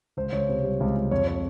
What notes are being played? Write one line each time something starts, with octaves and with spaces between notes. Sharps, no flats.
C#2 C5
C#2 C#5
C3 C5
G3
C#2
C#2
F2 C#5
C#5